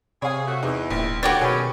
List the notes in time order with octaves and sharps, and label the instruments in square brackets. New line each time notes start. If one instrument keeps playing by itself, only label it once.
[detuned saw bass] C3 [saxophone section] G#4 [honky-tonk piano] C#5 F5
[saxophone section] A3 F#4
[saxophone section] E2 [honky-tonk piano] D#4
[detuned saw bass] D#1 [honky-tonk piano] A#1
[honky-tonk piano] D3 A3 A6 [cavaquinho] F#4 G4 C#5 [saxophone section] B4 D5
[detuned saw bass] B2 [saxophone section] D#3 F#3 C#4 [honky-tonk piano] G#4 B4